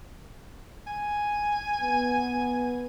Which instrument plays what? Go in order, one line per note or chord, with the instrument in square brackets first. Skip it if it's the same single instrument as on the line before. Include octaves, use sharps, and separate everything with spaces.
[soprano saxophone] G#5
[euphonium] B3